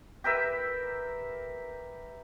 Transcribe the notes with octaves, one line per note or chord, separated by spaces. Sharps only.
G4 A#4 B4 E5